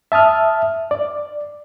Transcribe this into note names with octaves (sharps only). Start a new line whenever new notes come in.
E5 A5 D#6 F6
D5